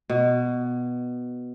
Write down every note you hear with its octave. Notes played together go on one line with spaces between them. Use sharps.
B2